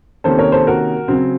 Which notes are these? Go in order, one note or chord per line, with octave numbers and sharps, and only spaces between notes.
C3 D#3 A#3 C#4 A4 C5
A#4 C#5
A4 C5
F#4 A#4
C#3 F#3 C4